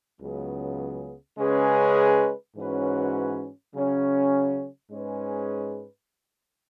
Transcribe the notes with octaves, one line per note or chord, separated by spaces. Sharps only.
C#2 C#3 F#3 B3 G#4
C#3 G#3 C#4 G#4 B4
G#2 E3 C#4 F#4 B4
C#3 F#3 C#4
G#2 G#3 C#4 G#4 B4